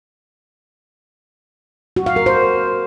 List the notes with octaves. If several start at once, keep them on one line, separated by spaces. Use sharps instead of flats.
F#4
F5
A#4
C5